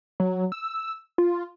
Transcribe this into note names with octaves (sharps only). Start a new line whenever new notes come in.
F#3
E6
F4